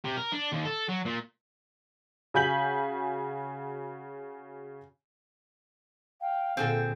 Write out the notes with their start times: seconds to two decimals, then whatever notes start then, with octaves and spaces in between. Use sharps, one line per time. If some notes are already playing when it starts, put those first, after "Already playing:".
0.04 C3
0.17 A#4
0.32 D4
0.52 D#2
0.65 A4
0.89 F#3
1.05 A#2
2.34 C#3 F#4 G#5 G6 B6 F#7
6.21 F5 G5
6.57 A#2 D3 C4 G#4 A4 F#5